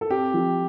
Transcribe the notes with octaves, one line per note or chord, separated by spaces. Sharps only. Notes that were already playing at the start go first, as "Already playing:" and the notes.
A4
C4 G4
F3